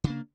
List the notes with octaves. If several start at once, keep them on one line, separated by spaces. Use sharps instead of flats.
C#3 A#3 D4